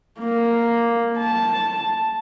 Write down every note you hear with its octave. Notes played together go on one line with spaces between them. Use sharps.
A#3
A5